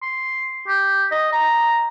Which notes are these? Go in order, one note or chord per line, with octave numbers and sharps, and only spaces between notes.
C6
G4
D#5
A#5